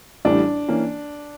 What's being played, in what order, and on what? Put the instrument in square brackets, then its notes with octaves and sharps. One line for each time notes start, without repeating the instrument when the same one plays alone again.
[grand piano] A1 A2 E3 G3 [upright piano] D4
[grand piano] E3 A#3 C#4